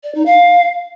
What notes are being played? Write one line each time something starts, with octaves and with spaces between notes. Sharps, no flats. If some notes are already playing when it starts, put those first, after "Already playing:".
D5
D#4
F5